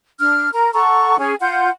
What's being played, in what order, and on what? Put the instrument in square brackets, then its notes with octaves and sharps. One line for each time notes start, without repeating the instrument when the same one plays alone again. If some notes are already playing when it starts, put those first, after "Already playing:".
[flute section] D4 F6
A#4 A#5
A4 F#5 A#5 C#6
C#4 G#4 C#5 G#5
F4 F#5 C6 G6